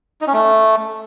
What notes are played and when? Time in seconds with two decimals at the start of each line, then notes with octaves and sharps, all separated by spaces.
0.21 D#4
0.27 C#4
0.34 A3